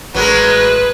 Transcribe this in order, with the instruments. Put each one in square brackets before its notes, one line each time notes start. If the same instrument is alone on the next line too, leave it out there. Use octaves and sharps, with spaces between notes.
[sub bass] A1 [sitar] F#3 G#3 A#4 [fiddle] B4